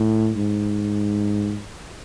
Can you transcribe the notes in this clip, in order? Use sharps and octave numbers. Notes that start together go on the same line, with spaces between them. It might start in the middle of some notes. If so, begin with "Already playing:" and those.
Already playing: A2
G#2